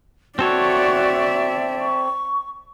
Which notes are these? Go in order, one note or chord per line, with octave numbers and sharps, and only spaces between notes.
C4 F#4 A4 C#5 D5 E5
C#6